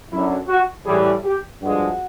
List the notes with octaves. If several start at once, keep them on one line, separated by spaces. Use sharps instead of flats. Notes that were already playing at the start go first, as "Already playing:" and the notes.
F#2 D3 F#3 E4
F#4
A2 E3 G3 G#4
G4
G2 D3 F3 G#3 F#4